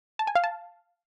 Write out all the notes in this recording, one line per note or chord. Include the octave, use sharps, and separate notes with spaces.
A5
G#5
F5
A5